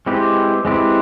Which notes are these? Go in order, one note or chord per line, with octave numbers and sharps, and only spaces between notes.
G#3 C4 E4 G4 B4
G#3 C4 E4 G4 B4